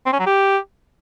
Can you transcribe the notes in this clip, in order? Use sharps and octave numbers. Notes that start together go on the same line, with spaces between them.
C4
C#4
F#3
G4